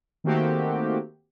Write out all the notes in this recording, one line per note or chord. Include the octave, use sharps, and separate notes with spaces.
D#3 A3 A#3 C4 F#4 G4